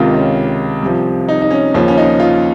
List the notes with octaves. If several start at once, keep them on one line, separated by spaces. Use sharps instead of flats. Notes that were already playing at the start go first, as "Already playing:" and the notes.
Already playing: C#2 C3 D#3 F4
C#4
C2 C3 F3
D#4
D#4
C#4
D#2 C#3 F3 C#4
C#4
D#4
F4